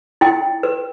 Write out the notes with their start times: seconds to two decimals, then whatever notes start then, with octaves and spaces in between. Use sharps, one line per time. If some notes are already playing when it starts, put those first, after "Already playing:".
0.21 E4 G5
0.63 B4